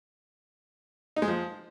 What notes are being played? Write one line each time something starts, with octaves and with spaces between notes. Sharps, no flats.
D#4
G#3
F3